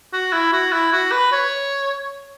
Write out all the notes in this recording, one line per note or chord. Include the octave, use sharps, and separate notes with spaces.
F#4
E4
F#4
E4
F#4
B4
C#5